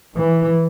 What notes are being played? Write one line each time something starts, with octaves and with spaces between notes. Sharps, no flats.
E3